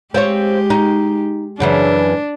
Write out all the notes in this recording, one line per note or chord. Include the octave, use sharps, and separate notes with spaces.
G#3 C4 F4 G4 C#5
D#4
F#2 C#3 E3 D4